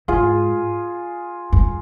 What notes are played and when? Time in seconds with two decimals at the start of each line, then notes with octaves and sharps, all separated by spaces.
0.08 G#2 F4 G#4
1.53 G2